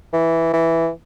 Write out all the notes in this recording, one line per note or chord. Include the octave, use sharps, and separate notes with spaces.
E3
E3